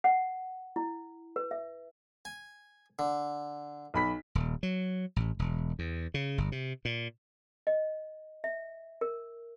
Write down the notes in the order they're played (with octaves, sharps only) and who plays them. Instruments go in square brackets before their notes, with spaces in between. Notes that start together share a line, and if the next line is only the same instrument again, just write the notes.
[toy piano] F#5
E4
B4
E5
[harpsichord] G#5
D3
[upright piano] B1 B5 B6
[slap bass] D#1
F#3
A1
E1
E2
C#3
G1
C3
A#2
[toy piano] D#5
E5
A#4